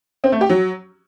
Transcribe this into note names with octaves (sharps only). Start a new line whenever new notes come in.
C4
A3
G4
F#3